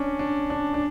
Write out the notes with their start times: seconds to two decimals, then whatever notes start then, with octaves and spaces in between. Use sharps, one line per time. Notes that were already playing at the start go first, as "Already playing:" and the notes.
Already playing: C#4 D4
0.19 D4
0.50 D4
0.74 D4